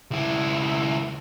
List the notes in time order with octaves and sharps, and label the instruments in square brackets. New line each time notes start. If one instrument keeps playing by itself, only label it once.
[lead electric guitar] C#2 E4